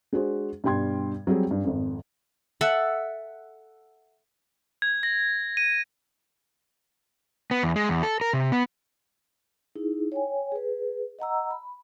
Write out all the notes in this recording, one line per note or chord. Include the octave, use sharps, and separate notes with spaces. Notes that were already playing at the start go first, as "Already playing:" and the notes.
G#3 D4 F#4 G#4 C5
G2 B2 G3 G5 C6 G#6
F#3 G3 C4 G#4
G2
G#1 F2
A4 E5 F#5
G#6
A#6
D#7
B3
E2
G#3
E2
A4
A#4
C3
B3
D#4 E4 G#4
C#5 G5 G#5
G#4 B4
D#5 F#5 A#5 E6
B5